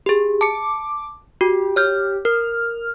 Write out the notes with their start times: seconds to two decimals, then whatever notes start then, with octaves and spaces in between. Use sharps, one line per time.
0.06 G4 G#4
0.41 A5 D6 C#7
1.41 F#4 G4
1.76 C#5 F6 G6
2.25 A#4 F6